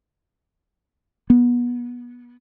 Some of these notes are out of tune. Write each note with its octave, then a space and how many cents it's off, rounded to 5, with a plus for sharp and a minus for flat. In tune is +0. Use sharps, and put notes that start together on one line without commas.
B3 -25